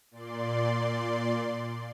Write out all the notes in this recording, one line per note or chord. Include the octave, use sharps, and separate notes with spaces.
A#2 D5 C6